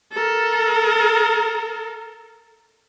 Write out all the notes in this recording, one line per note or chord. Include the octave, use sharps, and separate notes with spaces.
A4 A#4